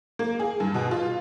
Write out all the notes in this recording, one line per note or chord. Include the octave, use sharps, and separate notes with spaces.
A#3
G#4
G2
B2
F4